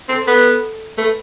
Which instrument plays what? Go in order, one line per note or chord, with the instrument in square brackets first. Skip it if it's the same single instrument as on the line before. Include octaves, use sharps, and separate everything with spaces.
[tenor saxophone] C4 [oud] A4
[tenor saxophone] B3
[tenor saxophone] A3 [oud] B4